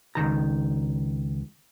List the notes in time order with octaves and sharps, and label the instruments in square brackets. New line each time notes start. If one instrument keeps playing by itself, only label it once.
[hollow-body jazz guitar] C#2 G#2 D#3 A#5